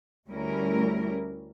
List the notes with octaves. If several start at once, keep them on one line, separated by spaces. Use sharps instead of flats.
D2 G3 A3 C#4 E4 A#4